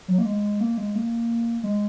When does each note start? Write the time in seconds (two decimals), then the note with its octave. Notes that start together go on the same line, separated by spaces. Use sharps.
0.08 F#3
0.18 A#3
0.25 G#3
0.60 A#3
0.78 G#3
0.95 A#3
1.63 G#3